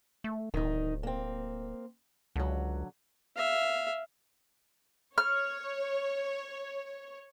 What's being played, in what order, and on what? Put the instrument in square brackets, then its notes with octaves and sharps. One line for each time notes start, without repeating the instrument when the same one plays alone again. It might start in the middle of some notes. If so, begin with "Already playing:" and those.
[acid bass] A3
[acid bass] D1 [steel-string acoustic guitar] D#3 D#4
[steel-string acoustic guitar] A#3 C4
[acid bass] C#2 [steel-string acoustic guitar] D3 F#3
[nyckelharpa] E5 F5
[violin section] C#5 [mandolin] F6